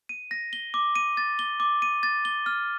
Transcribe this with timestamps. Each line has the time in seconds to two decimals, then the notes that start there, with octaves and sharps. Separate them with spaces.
0.09 D#7
0.31 A#6
0.53 G7
0.74 D6
0.96 D#7
1.17 A6
1.39 G7
1.60 D6
1.82 D#7
2.03 A6
2.25 G7
2.46 F6